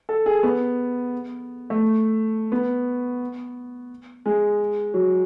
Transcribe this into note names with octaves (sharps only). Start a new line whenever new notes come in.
A4
G#4
B3
A3
B3
G#3
F#3